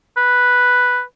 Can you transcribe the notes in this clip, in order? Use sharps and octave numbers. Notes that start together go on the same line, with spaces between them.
B4